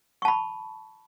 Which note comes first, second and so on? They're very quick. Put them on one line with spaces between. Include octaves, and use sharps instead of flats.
C#6 A5 B5